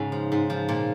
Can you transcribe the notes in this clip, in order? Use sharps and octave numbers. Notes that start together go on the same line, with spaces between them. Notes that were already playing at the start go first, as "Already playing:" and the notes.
Already playing: G#2 C#3 C#4
F3
G#2
F3
A#2